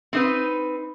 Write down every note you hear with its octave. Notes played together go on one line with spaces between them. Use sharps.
C4 D#4 B4